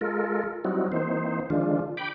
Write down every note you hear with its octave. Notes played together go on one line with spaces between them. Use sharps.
G#3 F4 A4 A#4
F#3 G3 C4 D#4 E4 F#4
E3 A#3 C4 D#4 C5
D3 D#3 F3 G#3 D4 F4
G5 B5 D6